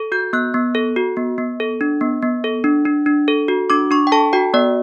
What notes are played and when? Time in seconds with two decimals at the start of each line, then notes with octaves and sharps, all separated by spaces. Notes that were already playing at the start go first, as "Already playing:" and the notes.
Already playing: A4
0.12 F#4 G6
0.33 B3 F#6
0.54 B3
0.75 A4
0.96 F#4
1.17 B3
1.38 B3
1.60 A4
1.81 D4
2.01 B3
2.22 B3
2.44 A4
2.64 D4
2.85 D4
3.06 D4
3.28 A4
3.48 F#4
3.70 D4 D6
3.91 D4 C#6
4.07 G5
4.12 A4 A5
4.33 F#4 G5
4.54 B3 D5